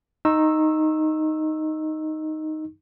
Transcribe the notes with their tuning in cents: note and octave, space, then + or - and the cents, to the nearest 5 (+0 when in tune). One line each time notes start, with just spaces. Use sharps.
D#4 +0 C#6 -40 E6 +0